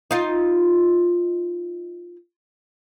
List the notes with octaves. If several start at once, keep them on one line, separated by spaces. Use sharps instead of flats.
D#4 F4